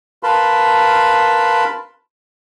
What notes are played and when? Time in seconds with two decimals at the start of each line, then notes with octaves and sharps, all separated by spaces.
0.23 A#4 B4 F5 A5 B5 C6